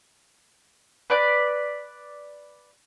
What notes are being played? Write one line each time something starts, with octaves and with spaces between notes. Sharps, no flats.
B4 D5 F#6